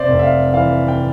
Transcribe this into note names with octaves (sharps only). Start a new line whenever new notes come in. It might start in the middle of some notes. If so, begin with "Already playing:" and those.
Already playing: C3 C5 D5 E5
F1
E5
F5
E3 F5
G5